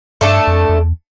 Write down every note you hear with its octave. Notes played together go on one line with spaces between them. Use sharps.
G2 A3 D4 A4
F2
F2
E2